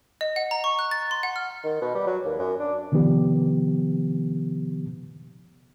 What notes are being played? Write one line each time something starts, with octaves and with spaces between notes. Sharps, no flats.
D#5
F#5
A#5
C#6
F#6
A6
C6
F#5
F6
D#3
B2
G3
F#3
D#2
F#2
D4
C3 D#3 F3 B3 G4